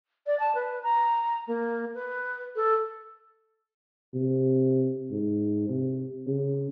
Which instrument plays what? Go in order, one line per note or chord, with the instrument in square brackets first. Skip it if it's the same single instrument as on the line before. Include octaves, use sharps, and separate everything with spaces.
[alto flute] D5
A5
B4
A#5
A#3
B4
A4
[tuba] C3
G#2
C3
C#3